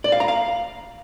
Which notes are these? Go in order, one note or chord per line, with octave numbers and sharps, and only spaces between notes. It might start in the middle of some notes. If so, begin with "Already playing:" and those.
D5
F5
A#5
F5